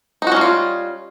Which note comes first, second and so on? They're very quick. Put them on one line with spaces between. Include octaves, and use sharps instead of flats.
D#4 F#4 C#4 G3 F4